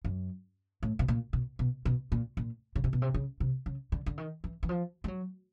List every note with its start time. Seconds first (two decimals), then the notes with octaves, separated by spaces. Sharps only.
0.05 F#2
0.83 A2
0.99 B2
1.08 A#2
1.33 B2
1.59 B2
1.85 B2
2.12 A#2
2.37 A#2
2.76 C#3
2.84 C3
2.93 B2
3.02 C3
3.14 C#3
3.40 C3
3.66 C#3
3.92 D3
4.06 D3
4.18 D#3
4.44 E3
4.63 E3
4.69 F3
5.04 G3
5.08 F#3